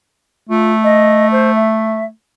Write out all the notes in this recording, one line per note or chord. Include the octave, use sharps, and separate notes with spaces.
A3 F4
D#5
C5
E5